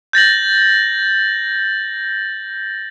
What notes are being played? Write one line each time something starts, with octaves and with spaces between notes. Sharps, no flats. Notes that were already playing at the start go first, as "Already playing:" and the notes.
G6 A6 A#6 F#7